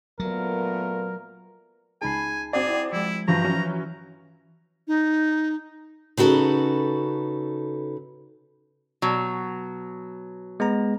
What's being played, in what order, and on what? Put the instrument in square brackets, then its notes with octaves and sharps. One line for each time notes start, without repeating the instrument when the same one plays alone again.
[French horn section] A#2 A3 B3 [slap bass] F#3 [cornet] A#4
[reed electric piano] C#2 D#4 G#4 [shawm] G#5 [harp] A5 B5 C7
[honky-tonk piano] C4 F#4 D5 [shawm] G#4
[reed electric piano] E4
[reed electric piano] F3 G#3 [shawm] E4
[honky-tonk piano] G2 A#6 [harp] E3 C#6 G6 [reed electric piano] F3 F#4 [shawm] A#5
[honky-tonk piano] F#3 C#4
[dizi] D#4
[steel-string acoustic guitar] C#3 D#4 F#4 A4 B4
[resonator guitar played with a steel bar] B2 F#3
[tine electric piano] G#3 B3 A#5